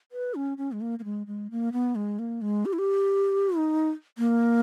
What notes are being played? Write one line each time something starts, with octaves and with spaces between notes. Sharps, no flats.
B4
C#4
C#4
G#3
A#3
A#3
G#3
G#3
A#3
B3
G#3
A#3
G#3
G4
E4
G4
D#4
A#3